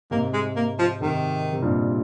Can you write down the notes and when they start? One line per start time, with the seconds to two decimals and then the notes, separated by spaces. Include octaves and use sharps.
0.11 G#2 C3 A#3
0.33 G#3
0.56 A#3
0.79 F3
1.01 G#2 C3 D#3
1.53 C3
1.62 G2 A#2